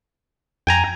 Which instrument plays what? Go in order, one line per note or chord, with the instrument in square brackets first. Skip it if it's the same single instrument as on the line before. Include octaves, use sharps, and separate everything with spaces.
[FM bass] F2 [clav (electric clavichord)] G5 G#5 A#5